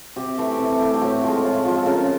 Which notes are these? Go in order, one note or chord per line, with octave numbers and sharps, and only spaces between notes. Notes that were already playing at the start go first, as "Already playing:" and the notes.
C3 G4
E3 A3
C3
E3 A3
G4
A2 F#4
F3 G#3
A2 F4
F3 G#3
A4
C#3 A#4